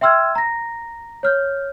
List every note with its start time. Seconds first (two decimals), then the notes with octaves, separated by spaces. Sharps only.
0.01 E5 G5 C6 E6 F6 G#6
0.35 A#5 A#6
1.23 C#5 F6 G6